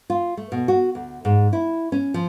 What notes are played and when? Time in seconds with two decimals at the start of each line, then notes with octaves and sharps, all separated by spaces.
0.10 F4
0.37 A3
0.52 B2
0.68 F#4
0.95 D2
1.25 G#2
1.53 E4
1.92 C#4
2.14 F3